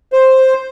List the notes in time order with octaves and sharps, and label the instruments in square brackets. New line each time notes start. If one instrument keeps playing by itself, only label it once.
[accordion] C5